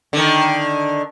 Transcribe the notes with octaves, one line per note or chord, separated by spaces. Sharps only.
D3 D#3